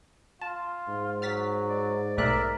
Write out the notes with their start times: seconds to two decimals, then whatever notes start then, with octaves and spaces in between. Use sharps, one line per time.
0.41 F4 A5
0.88 G#2
1.22 F#3 F6 A6 B6
1.69 D5
2.18 B1 A3 A#4 D5 E5 F#6